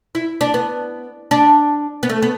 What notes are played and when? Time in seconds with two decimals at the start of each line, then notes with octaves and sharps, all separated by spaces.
0.15 E4
0.41 D4
0.54 B3
1.31 D4
2.03 B3
2.09 A3
2.22 B3